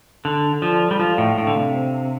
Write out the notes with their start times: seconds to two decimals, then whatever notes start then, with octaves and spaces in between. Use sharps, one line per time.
0.24 D3 A4
0.62 F3 D5
0.91 G3
0.99 F3 F5
1.18 A2
1.37 A2 D4
1.47 D3
1.56 C3
1.74 C5